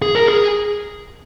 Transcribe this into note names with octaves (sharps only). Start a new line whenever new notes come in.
G#4
A#4
G#4